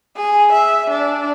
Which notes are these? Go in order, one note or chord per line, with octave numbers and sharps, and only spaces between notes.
G#4
E5
D4